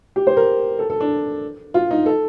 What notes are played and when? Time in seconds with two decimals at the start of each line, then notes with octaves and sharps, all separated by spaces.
0.16 G4
0.27 C5
0.37 A#4
0.79 A4
0.90 A4
1.00 D4
1.74 F4
1.91 D#4
2.06 A4